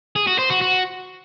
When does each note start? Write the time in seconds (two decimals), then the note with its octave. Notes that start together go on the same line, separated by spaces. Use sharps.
0.16 G#4
0.27 F#4
0.39 C5
0.50 F#4
0.61 F#4